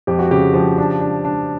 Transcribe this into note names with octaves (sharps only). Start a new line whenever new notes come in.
F2 G4
F#4
C#3 G4
F3
D4
D4
D4